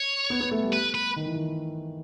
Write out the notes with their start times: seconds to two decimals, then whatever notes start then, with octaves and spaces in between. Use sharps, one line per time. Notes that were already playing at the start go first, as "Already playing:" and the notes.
Already playing: C#5
0.30 B3
0.40 B3
0.51 A3
0.62 G3
0.73 B4
0.95 B4
1.16 D#3
1.26 E3
1.35 D#3